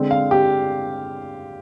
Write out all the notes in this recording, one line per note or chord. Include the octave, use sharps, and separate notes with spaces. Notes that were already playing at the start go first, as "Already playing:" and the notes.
Already playing: D3 G#3 C4
F5
G4